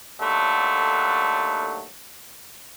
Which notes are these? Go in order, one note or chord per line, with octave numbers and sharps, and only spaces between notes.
D#2 D3 F#3 A3